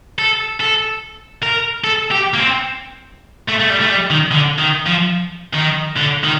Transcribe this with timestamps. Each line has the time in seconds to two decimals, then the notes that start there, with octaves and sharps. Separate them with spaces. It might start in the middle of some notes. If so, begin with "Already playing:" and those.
0.19 A4
0.61 A4
1.43 A#4
1.84 A4
2.11 G4
2.34 A#3
2.39 C4
3.49 A3
3.60 A3
3.70 G3
3.81 A3
3.90 G3
4.10 D#3
4.31 D3
4.59 D#3
4.86 F3
5.54 D#3
5.96 D3
6.24 D#3